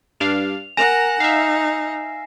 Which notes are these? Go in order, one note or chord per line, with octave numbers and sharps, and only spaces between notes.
G2 D4 F5 F7
A#4 F#5 G#5 A#5 A#6 E7
D#4 E5 F5 C7